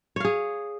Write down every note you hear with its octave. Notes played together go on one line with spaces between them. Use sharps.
G#4 C#5 F5